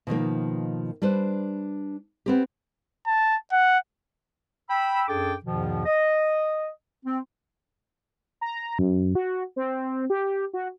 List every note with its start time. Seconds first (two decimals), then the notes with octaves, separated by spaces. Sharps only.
0.07 B2 D#3 F3 A#3
1.02 G3 D4 B4 C5
2.26 B3 C4 G4
3.07 A5
3.52 F#5
4.70 G5 B5 E6
5.08 F#2 D4 G#4 A4 G5 D6
5.45 E2 G#2 B2 D#3 F3
5.86 D#5
7.06 C4
8.41 A#5
8.79 F#2
9.15 F#4
9.56 C4
10.10 G4
10.53 F#4